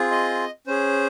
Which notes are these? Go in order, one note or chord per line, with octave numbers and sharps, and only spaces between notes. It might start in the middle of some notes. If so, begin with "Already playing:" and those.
Already playing: C4 F4 G#4
D#5
C#4 G#4 C5